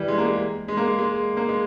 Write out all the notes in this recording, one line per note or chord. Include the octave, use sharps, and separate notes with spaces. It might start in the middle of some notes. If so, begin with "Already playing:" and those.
Already playing: E3 G3
G#3
A#3
G#3
G#3
A#3
G#3
G#3
A#3
G#3